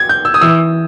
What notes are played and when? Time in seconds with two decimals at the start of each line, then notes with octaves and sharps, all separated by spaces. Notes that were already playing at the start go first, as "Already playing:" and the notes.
Already playing: G#6
0.09 G6
0.25 E6
0.34 D#6
0.41 E3 E6